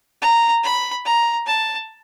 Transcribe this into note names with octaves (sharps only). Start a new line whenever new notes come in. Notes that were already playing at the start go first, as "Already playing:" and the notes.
A#5
B5
A#5
A5